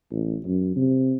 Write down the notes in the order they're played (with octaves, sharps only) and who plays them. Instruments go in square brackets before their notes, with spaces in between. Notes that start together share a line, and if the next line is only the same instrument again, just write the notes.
[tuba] A1
F#2
C3